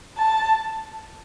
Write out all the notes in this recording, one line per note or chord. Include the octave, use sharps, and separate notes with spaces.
A5